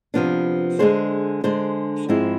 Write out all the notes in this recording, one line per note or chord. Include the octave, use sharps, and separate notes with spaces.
C3 F3 B3 D4
D3 G#3 D4 G#4 C5
D3 G#3 D4 G#4 C5
G#2 F3 G#3 C4 E4